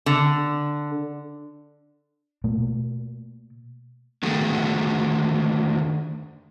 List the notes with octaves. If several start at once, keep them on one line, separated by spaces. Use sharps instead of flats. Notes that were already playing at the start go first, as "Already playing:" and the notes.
D3
B2 A3 A#3
D3 D#3 A3 F#4 G#4 A4